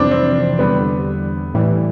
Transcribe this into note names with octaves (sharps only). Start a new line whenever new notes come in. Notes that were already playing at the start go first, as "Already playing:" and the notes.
Already playing: F2 C3 E3 G3 C4 D4
C4
E2 D3 G3 B3
A2 E3 G3